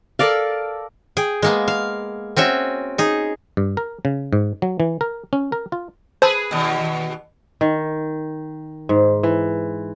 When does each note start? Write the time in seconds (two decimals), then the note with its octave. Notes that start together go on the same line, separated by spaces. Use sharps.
0.19 A4 A#4 D5 F5
1.17 G#4 G5
1.42 G#3 A#3 B3
1.68 F5
2.37 C4 C#4 F#4 E5
2.98 D#4 G#4
3.57 G2
3.77 A#4
4.05 C#3
4.33 G#2
4.62 F#3
4.80 E3
5.01 A#4
5.33 C#4
5.52 A#4
5.72 F4
6.22 G#4 B4 C5 A5 E6
6.51 D#2 B2
7.61 D#3
8.89 G#2
9.23 E3